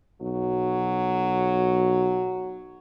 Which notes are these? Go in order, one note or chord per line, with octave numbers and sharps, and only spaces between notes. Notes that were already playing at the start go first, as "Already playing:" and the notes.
B1 F#3